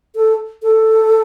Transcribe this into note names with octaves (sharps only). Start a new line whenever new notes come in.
A4
A4